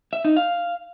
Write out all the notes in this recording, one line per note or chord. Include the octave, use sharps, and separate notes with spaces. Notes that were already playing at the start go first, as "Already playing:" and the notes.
E5
D#4
F5